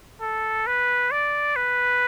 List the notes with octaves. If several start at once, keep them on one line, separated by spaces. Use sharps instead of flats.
A4
B4
D5
B4